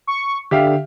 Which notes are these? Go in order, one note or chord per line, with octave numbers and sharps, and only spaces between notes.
C#6
D3 G4 E5 F5